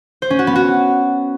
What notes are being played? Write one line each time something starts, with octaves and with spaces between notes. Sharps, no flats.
C5
C#4
F#4
B3
F#4